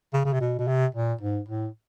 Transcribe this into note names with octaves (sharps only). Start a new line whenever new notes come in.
C#3
C#3
C3
B2
B2
C3
A#2
G#2
A2